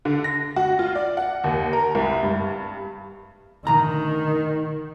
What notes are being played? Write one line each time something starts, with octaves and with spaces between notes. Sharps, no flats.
D3
A#6
F#4
F4
D5
F#5
D#2
A#4
C2
G2
D2 D#3 A#5